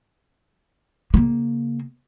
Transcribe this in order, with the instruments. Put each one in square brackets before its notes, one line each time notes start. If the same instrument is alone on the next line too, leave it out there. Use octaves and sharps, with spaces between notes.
[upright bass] C#3 A#3